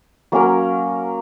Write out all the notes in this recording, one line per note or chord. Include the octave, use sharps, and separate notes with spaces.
F#3 A#3 C#4 A#4